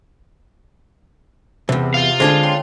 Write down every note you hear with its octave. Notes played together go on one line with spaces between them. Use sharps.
E2 G2 C3
F4 F5
D3 G#3 D4 G#4 A4 C5
C#5 G5 A5 C6